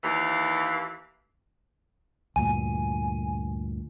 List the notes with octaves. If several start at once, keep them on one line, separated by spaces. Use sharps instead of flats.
D#2 E3 F5
D2 G2 A#2 G#5